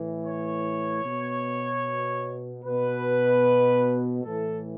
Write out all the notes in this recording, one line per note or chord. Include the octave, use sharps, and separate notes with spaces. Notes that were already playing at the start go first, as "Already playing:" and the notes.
Already playing: A2 E3
C#5
B2
B2 B4
A2 E3 A4